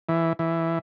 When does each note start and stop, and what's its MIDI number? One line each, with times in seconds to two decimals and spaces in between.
0.09 0.33 52
0.39 0.79 52